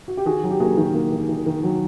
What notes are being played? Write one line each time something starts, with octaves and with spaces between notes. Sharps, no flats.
F#4
G4
D#3 F#4 G#4
F#3
G4
A#3 F#4 G#4
D#3
A#3
D#3
D#3
D#3
F#3